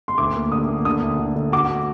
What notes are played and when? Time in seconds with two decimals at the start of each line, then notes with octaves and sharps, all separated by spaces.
0.08 C6
0.18 D2 D6
0.35 A#3
0.52 D3 D#6
0.68 A#3
0.85 D3 D#6
1.02 D2
1.19 D3
1.36 D3
1.52 F#4 D6
1.69 A3